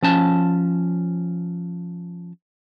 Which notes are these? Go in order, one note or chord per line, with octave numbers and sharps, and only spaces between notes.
F3 C#4 A5